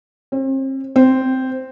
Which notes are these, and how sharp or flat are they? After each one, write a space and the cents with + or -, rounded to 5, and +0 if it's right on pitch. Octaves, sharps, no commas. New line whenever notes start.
C4 +40
C4 -5